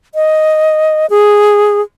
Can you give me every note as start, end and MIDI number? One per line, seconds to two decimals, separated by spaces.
0.15 1.06 75
1.10 1.81 68